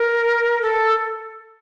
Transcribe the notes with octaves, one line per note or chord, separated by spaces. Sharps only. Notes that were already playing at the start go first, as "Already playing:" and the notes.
Already playing: A#4
A4